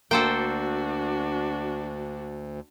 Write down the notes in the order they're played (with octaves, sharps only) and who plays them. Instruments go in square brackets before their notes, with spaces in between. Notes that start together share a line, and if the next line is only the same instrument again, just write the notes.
[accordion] D2 [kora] A#3 [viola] D4 F#4 [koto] A4 C5 G5